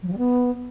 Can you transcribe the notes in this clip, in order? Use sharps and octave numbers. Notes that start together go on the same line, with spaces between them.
F#3
F3
G3
B3